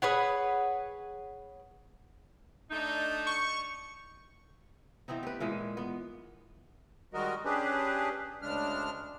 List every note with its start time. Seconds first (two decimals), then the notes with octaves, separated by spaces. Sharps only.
0.02 G#4 B4 C#5 F#5
2.71 A3 D4 D#4 G6
3.27 C#6
5.08 E3 B3 C4 D#4
5.23 G4 B4
5.40 A#2 E3 G#3
5.77 B3
7.14 D#3 G3 G#3 F#4 A#4 D#5
7.45 C#4 D4 G4 G#4 B4
8.42 D2 C#3 G#3 D4 F6